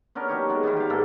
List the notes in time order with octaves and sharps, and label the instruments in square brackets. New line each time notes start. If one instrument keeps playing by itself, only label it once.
[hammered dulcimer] B3 C#4 D4 A#4
F#3 D#4 G4 C#5
G#3 B3
D#3 E3 G3 B3
G4 F5
G#2 G#3 A#3 A4